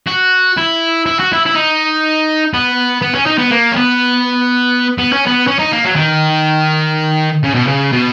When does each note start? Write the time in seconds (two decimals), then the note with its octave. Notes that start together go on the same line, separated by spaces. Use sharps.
0.07 F#4
0.57 E4
1.06 E4
1.20 F#4
1.33 E4
1.46 E4
1.55 D#4
2.54 B3
3.02 B3
3.15 C#4
3.27 D#4
3.38 B3
3.51 A#3
3.72 C#4
3.76 B3
4.98 B3
5.13 C#4
5.26 B3
5.47 C#4
5.59 D#4
5.73 A#3
5.85 F#3
5.96 D#3
7.44 C#3
7.55 B2
7.68 C#3
7.93 B2